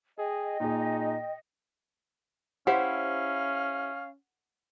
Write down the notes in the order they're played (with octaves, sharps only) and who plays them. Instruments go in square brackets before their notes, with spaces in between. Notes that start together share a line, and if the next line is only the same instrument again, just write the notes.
[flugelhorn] G#4 [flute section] D#5 [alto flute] G5
[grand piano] A#2 G#4 [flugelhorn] D#4
[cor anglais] C#4 [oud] E4 G4 C5 [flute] F5 [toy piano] F#5